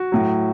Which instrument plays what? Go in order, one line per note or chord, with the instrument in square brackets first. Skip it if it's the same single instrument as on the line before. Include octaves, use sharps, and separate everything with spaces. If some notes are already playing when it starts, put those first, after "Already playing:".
Already playing: [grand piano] F#4
A2 F#3